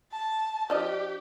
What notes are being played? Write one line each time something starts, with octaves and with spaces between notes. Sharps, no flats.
A5
F3 D4 G4 D#5